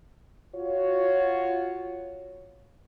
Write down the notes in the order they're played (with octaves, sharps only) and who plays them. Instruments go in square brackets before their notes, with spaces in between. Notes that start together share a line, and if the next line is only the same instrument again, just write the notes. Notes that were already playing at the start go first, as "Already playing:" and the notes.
[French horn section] F4 F#4 C#5